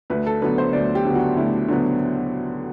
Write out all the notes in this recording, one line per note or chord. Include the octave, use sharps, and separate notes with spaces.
D2 B4
A4
D3 F#3 B3 B4
C5
D2 D5
G4
D3 F#3 B3
F#4
D2 E4
D3 F#3 B3